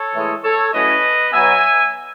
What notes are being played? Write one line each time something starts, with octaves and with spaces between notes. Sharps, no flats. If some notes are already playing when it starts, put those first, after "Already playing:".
Already playing: A4 C#5
A2 E3 G#3
A4 C#5
A2 F#3 C#4 B4 D#5
B2 F#3 B3 E5 G#5